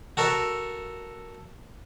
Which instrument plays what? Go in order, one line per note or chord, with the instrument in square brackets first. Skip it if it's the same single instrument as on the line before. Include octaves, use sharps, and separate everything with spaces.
[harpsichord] F#4 A4 A#4 E5